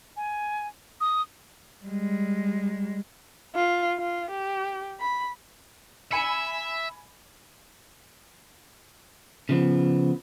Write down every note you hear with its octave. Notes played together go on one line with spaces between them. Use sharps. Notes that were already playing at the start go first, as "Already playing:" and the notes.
G#5
D#6
G3 G#3
F4
F4
G4
B5
E5 G#5 B5 C#7
C#3 F3 B3